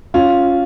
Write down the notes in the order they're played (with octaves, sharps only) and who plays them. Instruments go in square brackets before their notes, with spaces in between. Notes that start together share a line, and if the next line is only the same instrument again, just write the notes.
[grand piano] C#4 [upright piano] F4